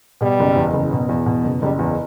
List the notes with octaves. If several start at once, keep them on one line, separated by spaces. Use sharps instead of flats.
B2 G3
F#1
E2
F#1
B2
E2
B2
F#1
F#1 G3
E2